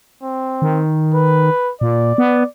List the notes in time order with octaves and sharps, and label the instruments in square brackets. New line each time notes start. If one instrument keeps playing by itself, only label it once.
[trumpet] C4
[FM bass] D#3
[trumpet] B4
[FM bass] A#2 [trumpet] D5
[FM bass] B3